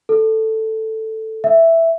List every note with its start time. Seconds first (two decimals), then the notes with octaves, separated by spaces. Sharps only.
0.09 A4
1.44 E5